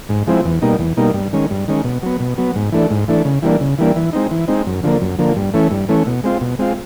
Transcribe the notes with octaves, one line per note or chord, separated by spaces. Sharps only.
G#2
F3 G#3 C4 E4
E2
B2 G3 A#3 D#4
E2
B2 G3 A#3 D#4
G2
D#3 G#3 C#4
G2
D#3 G#3 C#4
B2
F#3 B3
B2
F#3 B3
G#2
E3 A3 D4
G#2
E3 A3 D4
C#3
E3 G3 A#3 D4
C#3
E3 G3 A#3 D4
E3
G#3 C4 D#4
E3
G#3 C4 D#4
F#2
D3 F3 A#3
F#2
D3 F3 A#3
G2
E3 A3 C#4
G2
E3 A3 C#4
B2
G#3 C4 F4
B2
G#3 C4 F4